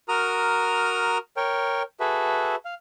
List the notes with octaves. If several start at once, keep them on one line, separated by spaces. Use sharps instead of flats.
F#4 A#4 A#5 D#6 F6
A#4 C#5 G5
F#4 G#4 A4 B4 E5
F5